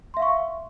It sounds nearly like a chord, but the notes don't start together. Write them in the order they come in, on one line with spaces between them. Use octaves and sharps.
C6 E5 F5 C#6